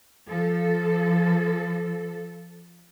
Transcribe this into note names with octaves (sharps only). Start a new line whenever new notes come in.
F3 A4